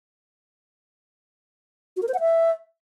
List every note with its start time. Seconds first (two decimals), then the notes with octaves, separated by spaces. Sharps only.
1.97 F#4
2.02 A#4
2.08 C5
2.14 F#5
2.20 E5